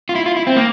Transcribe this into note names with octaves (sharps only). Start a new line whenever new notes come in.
F4
E4
F4
E4
C4
A#3